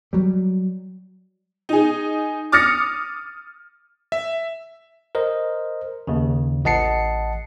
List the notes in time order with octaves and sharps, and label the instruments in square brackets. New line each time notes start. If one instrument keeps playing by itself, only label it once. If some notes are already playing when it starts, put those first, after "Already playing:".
[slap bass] F#3 G3
[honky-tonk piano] D#4 G#4
D6 D#6 F6 A6 A#6 C#7
[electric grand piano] E5
[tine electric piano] A#4 C5 D#5
D#2 C#3
A1 D#5 F#5 A5 C7 C#7